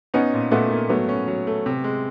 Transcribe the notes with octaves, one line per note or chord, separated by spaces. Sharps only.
B3 C#4 D#4
A#2
A#2 A3 B3
A#3
F#3 A3 B3
C#4
F#3
A3
C3
G#3